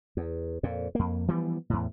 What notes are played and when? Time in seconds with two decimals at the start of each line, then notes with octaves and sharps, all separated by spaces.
0.17 E2
0.63 F2 A#2
0.95 F2 A#3
1.28 E3 F3 G3 B3
1.70 E2 A2